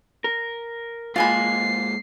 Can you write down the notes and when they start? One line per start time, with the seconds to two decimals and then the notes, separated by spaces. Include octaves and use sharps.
0.24 A#4
1.16 G#2 G#3 A#3 F4 G#5 B5 C7